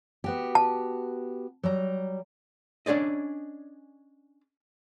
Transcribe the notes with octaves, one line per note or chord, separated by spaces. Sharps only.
B3 F#4 G4
A5
F#3 G3 A#5
C#4 D4 G#4 D5 D#5